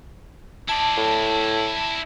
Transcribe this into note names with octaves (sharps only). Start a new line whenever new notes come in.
E4 D5 A5
A2